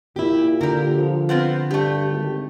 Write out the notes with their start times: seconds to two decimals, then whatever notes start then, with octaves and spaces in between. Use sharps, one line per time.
0.16 A#2 E4 G4
0.61 D3 G4 A#4
0.96 F3
1.29 B3 C4 F4
1.71 G2 A3 G4
2.10 G#1